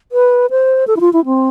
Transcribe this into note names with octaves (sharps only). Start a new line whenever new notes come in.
B4
C5
A4
E4
F4
E4
C4